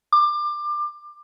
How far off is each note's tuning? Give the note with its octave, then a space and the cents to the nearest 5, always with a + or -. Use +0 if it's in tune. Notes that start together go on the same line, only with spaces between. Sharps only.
D6 +25